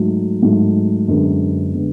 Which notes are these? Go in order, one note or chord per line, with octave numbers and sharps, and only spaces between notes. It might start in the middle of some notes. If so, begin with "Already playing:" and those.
Already playing: G#2 F#3 A3
G#2 F#3 A3
F#2 D3 G#3 B3
D3 G#3 B3